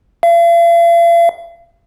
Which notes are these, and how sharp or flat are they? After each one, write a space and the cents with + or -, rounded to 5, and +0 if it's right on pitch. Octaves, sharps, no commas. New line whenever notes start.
F5 -45